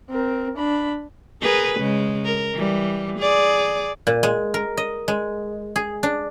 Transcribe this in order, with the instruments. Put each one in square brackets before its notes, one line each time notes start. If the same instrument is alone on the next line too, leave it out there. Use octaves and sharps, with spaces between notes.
[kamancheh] C4 A#4
D4 B5
[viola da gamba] G#4 A#4 B4
C#3 G#3
A#4
E3 G3
G#4 D5
[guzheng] A#2
G#3
A#4
D#5
G#3
G#4
D4